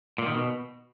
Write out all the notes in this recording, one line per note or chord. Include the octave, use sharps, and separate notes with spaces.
A#2
D#3
B2